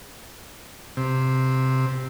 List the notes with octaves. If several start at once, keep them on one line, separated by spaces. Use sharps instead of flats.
C3